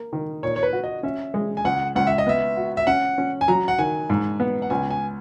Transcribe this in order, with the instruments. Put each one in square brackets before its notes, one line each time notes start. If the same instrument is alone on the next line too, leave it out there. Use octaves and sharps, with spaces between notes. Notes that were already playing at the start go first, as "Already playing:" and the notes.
Already playing: [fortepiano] A#3
D#3
[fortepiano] A#2 [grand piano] C#5
[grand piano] C#5
B4
[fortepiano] F#4
[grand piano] D#5
[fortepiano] C#4 [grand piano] E5
[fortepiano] G#3
[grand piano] G#5
[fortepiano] C#2 [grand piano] F#5
[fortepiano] C#2 [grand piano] F#5
[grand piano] E5
D#5
[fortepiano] B3 [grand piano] E5
[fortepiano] F#4
[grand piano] E5
[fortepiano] C#4 [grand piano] F#5
[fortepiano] C#4
[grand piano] G#5
[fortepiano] F#3 [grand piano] A#5
[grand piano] F#5
[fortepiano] D#3 [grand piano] G#5
[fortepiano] G#2
B3
[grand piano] F#5
[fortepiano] C#2 [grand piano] G#5
[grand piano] G#5